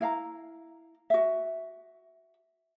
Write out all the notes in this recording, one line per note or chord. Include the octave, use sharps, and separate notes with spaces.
E4 F5 A#5
F#4 E5